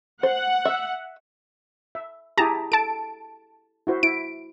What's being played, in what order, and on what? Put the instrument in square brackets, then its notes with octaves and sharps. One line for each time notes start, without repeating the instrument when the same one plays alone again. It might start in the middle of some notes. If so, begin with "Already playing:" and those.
[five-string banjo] C5 [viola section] F#5
[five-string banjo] E5
[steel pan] E5
[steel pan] E4 G4 G#4 [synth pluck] A5 A#5
[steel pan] A4 [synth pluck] A5 D7
[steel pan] E4 F#4 C5
[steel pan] E4 [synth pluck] D7